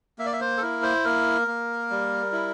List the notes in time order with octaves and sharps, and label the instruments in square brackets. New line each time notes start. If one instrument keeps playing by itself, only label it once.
[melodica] A#3 E5
D5
E5
C5
A4
E4 A#4
C5
A#3 A#4
A#3
G3
E4